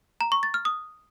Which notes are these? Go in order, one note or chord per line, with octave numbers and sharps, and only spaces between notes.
A#5
C#6
A6
F6
D#6